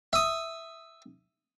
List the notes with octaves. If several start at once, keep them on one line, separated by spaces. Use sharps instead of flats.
E5 D#6